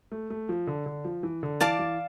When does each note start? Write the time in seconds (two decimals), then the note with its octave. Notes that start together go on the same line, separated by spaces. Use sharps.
0.12 A3
0.30 A3
0.49 F3
0.67 D3
0.86 D3
1.05 F3
1.23 E3
1.43 D3
1.61 E3 D5 F5 A5 D6
1.79 E3